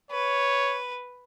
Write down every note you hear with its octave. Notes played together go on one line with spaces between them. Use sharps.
B4 C#5